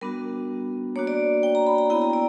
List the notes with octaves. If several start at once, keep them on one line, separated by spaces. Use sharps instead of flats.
G3 B3 D4 F#4 A#4
A#3 D4 F#4 C#5
D5
G5
A#5
B5
A#5
B3 E4 G5
A#5
D5